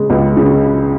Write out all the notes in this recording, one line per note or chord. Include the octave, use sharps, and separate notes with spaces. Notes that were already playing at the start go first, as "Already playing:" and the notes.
Already playing: C#3 G#3
C#2
C#3